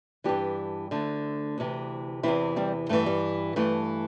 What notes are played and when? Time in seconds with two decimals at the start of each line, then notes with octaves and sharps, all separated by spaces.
0.24 G2 E3 D4 G4
0.91 D2 D3 A3
1.58 D2 C3 E3
2.23 E2 C3 E3 C4 E4
2.56 G3 C4
2.89 G2 E3 A3
3.06 G3
3.56 G2 E3 A3